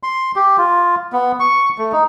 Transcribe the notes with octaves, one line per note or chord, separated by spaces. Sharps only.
C6
G4
F4
B3
C#6
A3
D#4